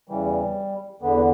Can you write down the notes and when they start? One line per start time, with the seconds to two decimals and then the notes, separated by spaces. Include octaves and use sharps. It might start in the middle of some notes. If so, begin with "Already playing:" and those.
0.09 E2 C#3 E3 G3
1.02 E2 D3 B3